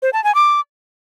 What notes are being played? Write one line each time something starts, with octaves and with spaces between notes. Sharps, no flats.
C5
A5
G#5
D6